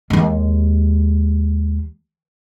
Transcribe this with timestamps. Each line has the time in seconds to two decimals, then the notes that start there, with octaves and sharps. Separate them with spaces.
0.10 D#2 G#3